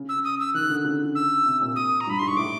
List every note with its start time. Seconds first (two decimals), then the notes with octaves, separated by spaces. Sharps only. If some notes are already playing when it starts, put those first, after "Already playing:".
Already playing: C#3
0.09 E6
0.24 D#6
0.40 E6
0.54 D#3 F#6
0.70 D3
0.84 C#3
1.15 E6
1.45 C3
1.61 A#2
1.76 D#6
2.01 A#5
2.07 G2
2.10 B5
2.19 G#2 C6
2.28 C#6
2.37 A2 D6